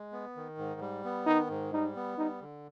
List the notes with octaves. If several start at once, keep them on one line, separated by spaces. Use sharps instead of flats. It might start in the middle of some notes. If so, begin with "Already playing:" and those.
Already playing: G#3
B3
D#3
G#2
G3
B3
D#3 D#4
G#2
G3 D#4
B3
G3 D#4
D3